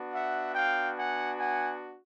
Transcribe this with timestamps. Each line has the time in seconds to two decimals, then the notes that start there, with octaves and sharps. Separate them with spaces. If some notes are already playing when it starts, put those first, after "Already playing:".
Already playing: B3 D4 F#4
0.14 E5 F#5
0.55 F5 G5
0.97 F#5 G#5
1.39 F#5 G#5